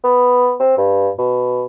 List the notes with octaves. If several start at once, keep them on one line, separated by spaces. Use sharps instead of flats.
B3
C4
G2
B2